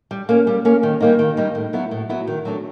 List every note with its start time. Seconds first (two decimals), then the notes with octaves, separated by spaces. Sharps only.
0.11 G3
0.29 A#3 C#4
0.47 G3
0.65 A#3 C#4
0.83 D#3
1.00 G3 A#3 D#4
1.19 D#3
1.37 G3 A#3 D#4
1.55 A2
1.73 F#3 B3 E4
1.91 A2
2.09 F#3 B3 E4
2.27 D#3
2.45 F#3 A3 D4